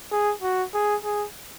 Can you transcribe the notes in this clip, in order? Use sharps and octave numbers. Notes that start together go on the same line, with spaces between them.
G#4
F#4
G#4
G#4